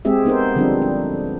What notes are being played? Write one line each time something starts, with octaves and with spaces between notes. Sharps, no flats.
G#3 C4 G4 G#4 E5
B3 D#4 A#4 C5
D3 F3 G3 C4 D4
D4